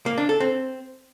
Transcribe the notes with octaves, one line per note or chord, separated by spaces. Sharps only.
A#3
D4
A4
C4